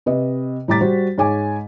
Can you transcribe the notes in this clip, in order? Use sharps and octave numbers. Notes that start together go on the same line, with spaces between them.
C3 B4 D#5
A2 G3 A#5 D6 A6 B6
G3 F#4 C5
G#2 C#5 G#5 D6